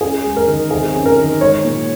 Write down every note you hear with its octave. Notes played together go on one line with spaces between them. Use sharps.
C#4 G#4
G#3
A#4
D#3
C3 G#4
C#4
A#4
D#3
G#3 C#5
A#2